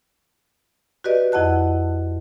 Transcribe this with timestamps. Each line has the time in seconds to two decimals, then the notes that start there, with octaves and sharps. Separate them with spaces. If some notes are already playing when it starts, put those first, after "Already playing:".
1.04 F#4 G4 B4 D5 D#5
1.32 F2 E4 D#5 F#5 A5 F#6